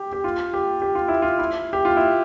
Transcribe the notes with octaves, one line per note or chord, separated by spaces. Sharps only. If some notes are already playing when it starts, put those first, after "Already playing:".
Already playing: G4
G4
F4
G4
G4
F4
E4
F4
E4
G4
F4
E4